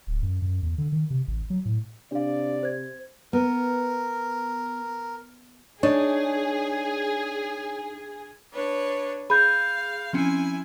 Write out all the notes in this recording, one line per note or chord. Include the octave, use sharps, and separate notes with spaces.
D1
F#2
F#2
E2
D3
D#3
C3
A1
F#3
A2
C3 D4 D5 F5
C5 G#6
B3 A#4
D4 D#4 G#4 C#5
D4 B4 C#5
G#4 F5 B5 G6
F3 C4 C#4 E4 G#5